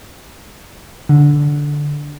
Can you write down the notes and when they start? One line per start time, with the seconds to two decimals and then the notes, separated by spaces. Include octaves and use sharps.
1.09 D3